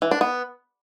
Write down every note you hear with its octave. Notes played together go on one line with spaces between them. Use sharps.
E3
D4
B3